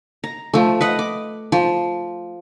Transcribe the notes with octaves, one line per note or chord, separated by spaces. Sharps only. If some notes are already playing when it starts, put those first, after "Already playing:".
A#5
F3 A3
B4 D#5 F#5
D6
F3